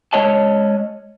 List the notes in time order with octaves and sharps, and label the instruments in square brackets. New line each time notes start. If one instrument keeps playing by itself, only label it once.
[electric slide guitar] G#3 C#5 D#5 A5